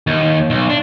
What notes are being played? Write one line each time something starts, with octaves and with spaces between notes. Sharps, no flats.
D#2
B1
D4